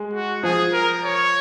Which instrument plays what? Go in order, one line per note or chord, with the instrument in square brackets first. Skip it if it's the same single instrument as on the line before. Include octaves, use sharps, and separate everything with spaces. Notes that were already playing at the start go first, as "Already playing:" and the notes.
Already playing: [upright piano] G#3
[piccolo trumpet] F#4
[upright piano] F3 [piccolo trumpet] G#4
[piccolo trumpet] A#4
C#5